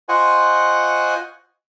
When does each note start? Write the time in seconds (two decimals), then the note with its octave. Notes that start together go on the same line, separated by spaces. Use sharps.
0.09 F4 C5 D#5 F#5 G#5 C#6